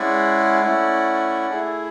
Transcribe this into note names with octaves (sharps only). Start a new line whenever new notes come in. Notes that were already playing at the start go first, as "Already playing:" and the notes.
Already playing: G#3 C#4 E4 G#4 D5 F#5
A3 C#4 E4
A3 E4 G#4